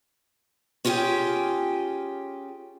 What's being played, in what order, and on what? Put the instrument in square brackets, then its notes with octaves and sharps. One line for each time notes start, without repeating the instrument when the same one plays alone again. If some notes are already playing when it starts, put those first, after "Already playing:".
[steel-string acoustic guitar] C#4 F4 G4 G#4 G5